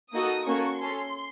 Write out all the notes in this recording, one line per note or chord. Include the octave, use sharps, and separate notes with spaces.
A#3 D#4 F#4 A4 D#6
A#3 C#4 F#4 A4 C#6
C#4 A4 C6